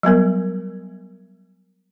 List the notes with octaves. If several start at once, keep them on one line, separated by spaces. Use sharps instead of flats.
F#3 G3 B3 A#4